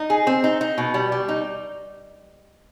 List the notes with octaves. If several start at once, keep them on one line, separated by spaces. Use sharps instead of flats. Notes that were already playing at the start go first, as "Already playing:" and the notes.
Already playing: D#4
G#4
C4
D#4
D#4
B2
G3
G3
D#4